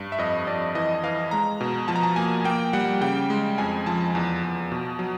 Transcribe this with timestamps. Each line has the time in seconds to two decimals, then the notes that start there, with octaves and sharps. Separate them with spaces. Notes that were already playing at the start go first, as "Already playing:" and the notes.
Already playing: G2
0.12 E5
0.18 F2 D#5
0.47 F2 D5
0.75 E3 D#5
1.03 E3 F5
1.31 G#3 A#5
1.61 B2
1.88 F3 A5
1.96 A#5
2.03 A5
2.16 A#3 G#5
2.44 A#3 G5
2.73 G3 F#5
3.01 C#3 G5
3.30 G#3
3.58 F2 G#5
3.86 F3 A5
4.15 E2
4.43 E2
4.72 B2
4.99 F#3